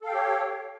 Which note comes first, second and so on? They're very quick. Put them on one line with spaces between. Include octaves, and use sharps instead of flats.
A4 F5 G5 G4 C#5